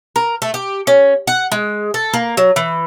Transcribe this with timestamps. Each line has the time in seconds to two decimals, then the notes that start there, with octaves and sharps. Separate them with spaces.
0.16 A#4
0.42 A3
0.54 G4
0.87 C#4
1.27 F#5
1.52 G#3
1.94 A4
2.13 A#3
2.37 F#3
2.56 E3